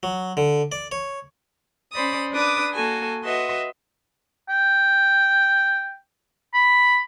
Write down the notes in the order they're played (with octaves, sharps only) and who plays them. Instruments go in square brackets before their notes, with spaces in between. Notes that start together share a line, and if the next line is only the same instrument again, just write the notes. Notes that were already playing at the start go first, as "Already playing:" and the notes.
[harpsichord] F#3
D3
D5
C#5
[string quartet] C#4 C5 D5 B5 D#6
D4 B4 D6 D#6
A#3 F#4 A4 G#5
F#4 B4 D#5 E5 C6
[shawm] G5
B5